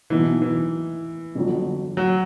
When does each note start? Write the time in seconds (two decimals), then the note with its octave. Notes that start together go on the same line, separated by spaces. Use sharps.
0.10 B2 E3 F#3 B3 D#4
0.42 E3
1.35 G1 F2 D3 F#3
1.97 F#3